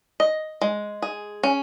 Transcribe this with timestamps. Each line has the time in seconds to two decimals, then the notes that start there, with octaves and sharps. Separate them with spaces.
0.20 D#5
0.61 G#3
1.02 G#4
1.43 C#4